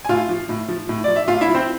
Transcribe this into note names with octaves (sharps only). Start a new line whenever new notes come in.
G#5
A2 F4 F5
F3
A2
F3
A2
F3 D5
E5
A2 F4 F5
E4 E5
F3
C4 C5